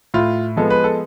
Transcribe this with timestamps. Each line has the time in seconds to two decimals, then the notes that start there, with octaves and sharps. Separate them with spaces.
0.14 A2 F4
0.57 F3 G#3 B3 A4
0.70 B4
0.84 A4